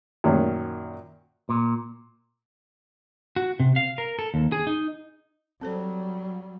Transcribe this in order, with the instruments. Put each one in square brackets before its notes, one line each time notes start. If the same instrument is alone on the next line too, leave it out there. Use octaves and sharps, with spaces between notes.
[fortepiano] F#2 A#2 D#3 C#4
[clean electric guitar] A#2
F#4
C3
F5
A#4
A4
D#2
G#4
D#4
[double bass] F#3 G3 [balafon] C4 A4 C5